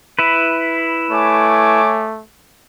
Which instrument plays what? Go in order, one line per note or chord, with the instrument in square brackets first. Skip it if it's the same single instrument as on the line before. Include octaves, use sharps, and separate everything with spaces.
[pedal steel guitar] E4 B4
[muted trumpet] A3 [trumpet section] C#5 G#5 D6